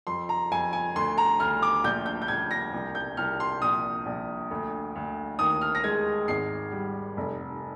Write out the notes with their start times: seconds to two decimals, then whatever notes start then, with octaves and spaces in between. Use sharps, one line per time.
0.07 F2 C6
0.29 A#5
0.51 F2 G#5
0.73 G#5
0.96 D2 C6
1.18 A#5
1.39 D2 F6
1.62 D6
1.84 A#1 G6
2.06 G6
2.22 G6
2.28 A#1 G#6
2.51 A#6
2.72 C2
2.95 G6
3.17 C2 F6
3.40 C6
3.62 A#1 D#6
4.06 A#1
4.51 D2
4.95 D2
5.39 D#2 D#6
5.61 F6
5.75 A#6
5.84 G#3 G#6
6.28 G#1 C7
6.72 G3
7.17 F1